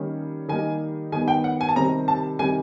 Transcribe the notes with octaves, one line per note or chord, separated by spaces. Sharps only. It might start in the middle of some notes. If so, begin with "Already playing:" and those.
Already playing: D#3 G3 A#3 C#4
D#3 G3 A#3 D#4 G#5
D#3 G3 B3 D#4 G#5
G5
F#5
G#5
A5
C3 D#3 G3 C4 A#5
A5
C3 D#3 G3 G#5